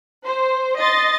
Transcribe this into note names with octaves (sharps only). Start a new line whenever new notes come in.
C5
D#5 C6 A6